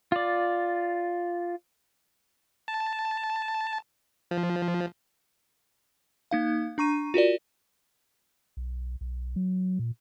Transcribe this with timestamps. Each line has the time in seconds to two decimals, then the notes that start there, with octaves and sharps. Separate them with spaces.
0.12 F4 D5
2.68 A5
4.31 F3
6.31 A#3 D#4 F5
6.78 D4 A#5 C#6 D#7
7.14 F4 F#4 A#4 D5
8.57 B1
9.01 B1
9.36 F#3
9.79 A#2